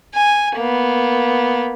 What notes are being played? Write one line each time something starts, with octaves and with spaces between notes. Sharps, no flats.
G#5
A#3 B3